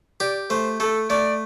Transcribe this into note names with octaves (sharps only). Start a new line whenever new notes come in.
G4 D5
A3 C5
A3 A4
A3 D5